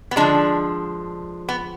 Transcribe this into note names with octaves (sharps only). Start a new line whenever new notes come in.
B3
D3 F3 G#3 D4
B3